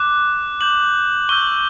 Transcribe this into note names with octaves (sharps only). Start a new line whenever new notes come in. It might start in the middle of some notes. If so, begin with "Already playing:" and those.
Already playing: D6 F#6
D6 G6 F#7
C#6 E6 G6 G7